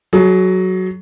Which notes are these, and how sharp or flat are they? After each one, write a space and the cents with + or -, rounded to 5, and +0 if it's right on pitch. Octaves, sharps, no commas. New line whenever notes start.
F#3 +5 G#4 +35